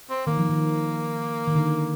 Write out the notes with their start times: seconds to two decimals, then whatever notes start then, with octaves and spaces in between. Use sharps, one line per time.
0.10 C4
0.27 D#3 A#3
0.37 F3
0.49 D#3
1.47 D#3
1.55 D3